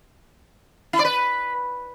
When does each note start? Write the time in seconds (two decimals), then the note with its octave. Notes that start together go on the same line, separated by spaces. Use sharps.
0.93 E4
0.99 D5
1.05 B4